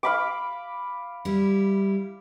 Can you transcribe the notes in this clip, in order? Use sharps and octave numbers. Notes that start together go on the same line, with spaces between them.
F5 B5 D6
G3 E4